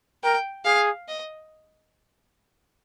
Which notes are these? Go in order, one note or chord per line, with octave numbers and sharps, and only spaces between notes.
A#4 G5
G#4 F5
D#5